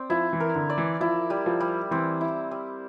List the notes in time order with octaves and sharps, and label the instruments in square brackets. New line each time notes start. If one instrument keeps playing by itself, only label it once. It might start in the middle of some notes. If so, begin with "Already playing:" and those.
Already playing: [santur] C4 D5
[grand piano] F3 [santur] E4
[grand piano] E3
[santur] A#4
[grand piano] D3
[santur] D5
[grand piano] E3
[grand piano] F3 [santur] E4
[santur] G3
[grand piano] F3
[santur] G3
[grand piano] E3 [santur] C4
[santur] E4
G3